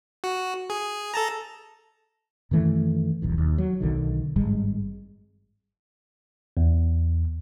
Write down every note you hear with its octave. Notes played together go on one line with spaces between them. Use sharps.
F#4
G#4
A4 A5 A#5
F#2 D#3 E3 A3
D#1 B1 E2
D#2
F#3
B1 D3 D#3
G#1 G2 G3 G#3
E2